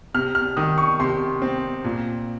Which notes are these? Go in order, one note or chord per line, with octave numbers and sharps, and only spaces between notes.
C3 F6
F6
D#3 D#6
C#6
C3 C6
C4
A#2